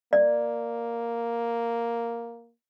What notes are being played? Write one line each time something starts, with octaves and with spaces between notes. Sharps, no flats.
A#3 D5